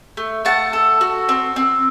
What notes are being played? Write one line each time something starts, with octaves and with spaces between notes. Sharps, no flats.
A3
A3 F#5 A5
A4
F#4
C4
C4